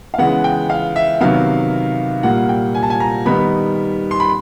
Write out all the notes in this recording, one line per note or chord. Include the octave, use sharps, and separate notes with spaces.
F5
C#3 E3 G#3 B3 F#5
G5
F5
E5
C3 D#3 F#3 B3 F5
A#2 G3 A#3 F#5
G5
G#5
A5
G#5
A#5
D#3 G3 B3 D#4 B5
C6
B5